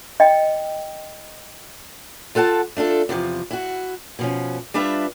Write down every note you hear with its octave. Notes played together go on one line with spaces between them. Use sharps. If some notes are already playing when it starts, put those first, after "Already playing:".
D#5 G5
F4 A4 F#5 G#5 A5
A3 D4 F4 A4
E2 C3 E3 F3
E4 F#4
B2 F3 C#4
G3 D4 F4 B4 E5